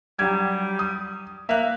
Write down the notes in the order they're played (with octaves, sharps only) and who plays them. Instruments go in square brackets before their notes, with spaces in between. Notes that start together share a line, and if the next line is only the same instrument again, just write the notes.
[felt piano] F#3 G4 G#6 [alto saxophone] G3
[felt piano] D#6
[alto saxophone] A#3 [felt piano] E5 F#6